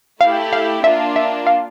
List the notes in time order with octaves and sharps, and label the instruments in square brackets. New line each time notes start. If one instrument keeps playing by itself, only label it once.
[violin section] A3 E4 G4 [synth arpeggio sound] F5
[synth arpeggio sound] F5
[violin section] A#3 D4 F4 [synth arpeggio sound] E5
[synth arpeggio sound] E5
F5